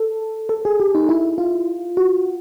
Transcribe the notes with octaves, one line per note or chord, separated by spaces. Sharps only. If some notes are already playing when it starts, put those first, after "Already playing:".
Already playing: A4
A4
G#4
G4
D#4
E4
F4
F#4